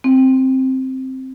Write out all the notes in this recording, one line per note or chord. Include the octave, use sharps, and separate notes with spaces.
C4